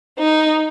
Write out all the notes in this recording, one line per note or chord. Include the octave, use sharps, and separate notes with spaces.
D#4